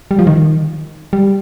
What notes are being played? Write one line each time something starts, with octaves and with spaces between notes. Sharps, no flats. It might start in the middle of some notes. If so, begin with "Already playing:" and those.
G3
F3
D#3
G3